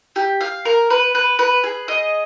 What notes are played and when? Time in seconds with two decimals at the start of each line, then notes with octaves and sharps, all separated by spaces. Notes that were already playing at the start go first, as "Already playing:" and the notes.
0.16 G4
0.41 F5
0.65 A#4
0.90 B4
1.15 B4
1.39 B4
1.64 G#4
1.88 D#5